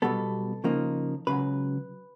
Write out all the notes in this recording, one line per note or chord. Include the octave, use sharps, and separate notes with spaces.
B1 B2 G3 B3 A4
C#3 F3 A#3 D#4
C#2 C#3 F#3 B4